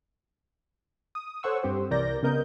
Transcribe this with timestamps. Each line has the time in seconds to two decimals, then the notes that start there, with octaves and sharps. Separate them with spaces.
1.15 D#6
1.43 A4 C5 C#5 F#5 C#6 E6
1.63 G2 C4 G4 C5
1.91 C2 E3 A#4 D5 G6 A#6
2.23 C#3 B3 A#4 D#5 G6